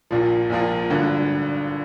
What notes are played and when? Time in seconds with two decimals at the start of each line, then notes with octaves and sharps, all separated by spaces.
0.11 A#1 A#2 F3
0.50 A#1 A#2 F3
0.90 G#1 G2 D3